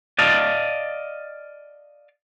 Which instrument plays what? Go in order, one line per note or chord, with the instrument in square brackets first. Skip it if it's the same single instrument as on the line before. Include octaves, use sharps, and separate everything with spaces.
[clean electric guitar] D5 D#5 F5 A5